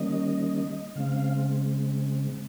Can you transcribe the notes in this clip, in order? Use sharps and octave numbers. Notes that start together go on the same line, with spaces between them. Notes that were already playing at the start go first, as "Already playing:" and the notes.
Already playing: D#3 G3 A#3 C#4 D#5
C#3 G#3 C4 F5